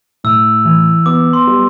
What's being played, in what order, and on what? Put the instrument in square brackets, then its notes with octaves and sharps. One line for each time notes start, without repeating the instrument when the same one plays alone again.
[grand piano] A2 [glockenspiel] E6
[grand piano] E3
[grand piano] B3 [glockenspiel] D6
[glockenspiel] C6
[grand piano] G3